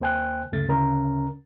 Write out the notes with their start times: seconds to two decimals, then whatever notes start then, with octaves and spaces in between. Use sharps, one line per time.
0.01 D#2 A#3 C5 G5 G#5 F#6
0.52 D2 G2 C#3 A3 A6
0.68 D2 C#3 C#4 A#4 A#5